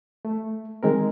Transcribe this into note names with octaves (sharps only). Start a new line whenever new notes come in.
A3
D#3 G#3 C4 A#4